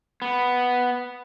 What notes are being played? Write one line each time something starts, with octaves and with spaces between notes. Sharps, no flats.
B3